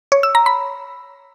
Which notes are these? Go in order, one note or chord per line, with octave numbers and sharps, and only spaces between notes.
C#5
E6
A#5
B5